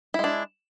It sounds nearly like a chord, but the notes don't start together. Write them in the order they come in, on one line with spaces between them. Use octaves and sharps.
E4 G#3 D4